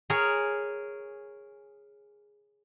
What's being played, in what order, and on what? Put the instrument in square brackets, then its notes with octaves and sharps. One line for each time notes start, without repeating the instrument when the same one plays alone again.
[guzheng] G#4 A#4 C#5